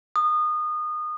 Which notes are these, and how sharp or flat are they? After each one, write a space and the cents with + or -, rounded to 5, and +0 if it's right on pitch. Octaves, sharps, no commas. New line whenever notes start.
D#6 -25